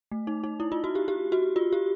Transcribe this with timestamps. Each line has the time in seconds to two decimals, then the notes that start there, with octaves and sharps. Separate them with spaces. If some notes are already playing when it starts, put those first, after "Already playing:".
0.12 A3
0.27 D#4
0.44 D#4
0.60 E4
0.72 F4
0.84 F#4
0.95 G4
1.08 G4
1.32 F#4
1.56 F4
1.73 G4